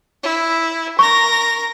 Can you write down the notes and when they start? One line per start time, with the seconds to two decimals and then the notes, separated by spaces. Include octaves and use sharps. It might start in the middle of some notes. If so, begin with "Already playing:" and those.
0.24 E4
0.99 A#4 C#6 A#6